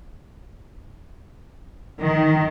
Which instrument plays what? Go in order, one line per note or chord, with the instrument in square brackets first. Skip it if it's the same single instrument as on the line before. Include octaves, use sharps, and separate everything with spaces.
[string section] D#3